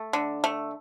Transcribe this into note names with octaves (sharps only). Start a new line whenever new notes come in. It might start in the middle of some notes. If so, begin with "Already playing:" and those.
Already playing: A3
D3
A3